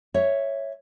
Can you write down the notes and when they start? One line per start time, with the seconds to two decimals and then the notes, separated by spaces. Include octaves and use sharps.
0.14 C#5 E5